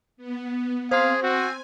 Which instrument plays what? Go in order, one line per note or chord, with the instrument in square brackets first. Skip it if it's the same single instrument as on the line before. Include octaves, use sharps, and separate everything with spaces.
[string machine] B3
[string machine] C4 [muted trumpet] G#4 [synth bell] C5 C6 [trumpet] F5
[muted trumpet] C4 [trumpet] F#4 [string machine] G#5